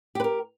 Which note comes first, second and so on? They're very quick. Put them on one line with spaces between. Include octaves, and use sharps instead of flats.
G4 B4 A#4